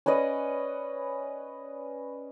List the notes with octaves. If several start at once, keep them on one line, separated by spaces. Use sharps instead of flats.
C#4 B4 D5 D#5